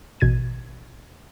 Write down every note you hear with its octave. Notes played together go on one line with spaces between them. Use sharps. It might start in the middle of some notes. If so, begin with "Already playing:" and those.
A1 B2 G#6 A6 D#7